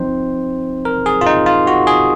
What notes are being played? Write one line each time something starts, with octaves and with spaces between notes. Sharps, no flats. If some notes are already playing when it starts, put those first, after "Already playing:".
Already playing: F3 C4 D#4 C5
A#4
G#4
F4
D#4
F4
F#4
G#4